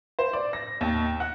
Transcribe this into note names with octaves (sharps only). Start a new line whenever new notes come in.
C5
D5
A#6
D#2
F#5